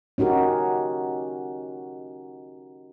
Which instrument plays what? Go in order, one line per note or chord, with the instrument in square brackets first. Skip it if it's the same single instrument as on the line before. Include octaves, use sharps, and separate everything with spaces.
[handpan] C#4 D#4 F#4 G4 A#4